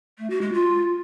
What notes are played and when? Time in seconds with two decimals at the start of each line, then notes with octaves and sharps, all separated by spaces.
0.18 A3
0.30 F#4
0.41 G#3
0.53 F4